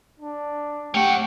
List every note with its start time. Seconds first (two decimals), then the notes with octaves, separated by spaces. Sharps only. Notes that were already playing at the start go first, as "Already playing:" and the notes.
0.20 D4
0.94 A3 C#4 G4 F#5 G5